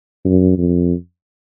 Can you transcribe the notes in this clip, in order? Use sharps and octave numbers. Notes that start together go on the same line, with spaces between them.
F#2
F2